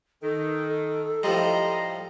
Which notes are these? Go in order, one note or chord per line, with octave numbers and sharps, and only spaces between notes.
D#3 A4
A2 F3 G3 D#5 A#5 C6